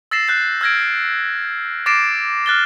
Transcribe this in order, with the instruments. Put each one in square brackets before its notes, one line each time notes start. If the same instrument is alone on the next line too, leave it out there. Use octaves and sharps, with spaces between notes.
[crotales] E6 A6 A#6 C7 E7
F#6 G6 C7
E6 F6 G#6 A#6 D7
D6 A6 A#6 C7 D7 E7
F6 F#6 A6 G7